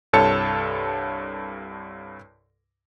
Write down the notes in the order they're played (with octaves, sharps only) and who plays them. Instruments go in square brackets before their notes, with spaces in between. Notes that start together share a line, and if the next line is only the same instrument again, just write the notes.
[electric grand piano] C2 G2 A4 C#5 A5 C#7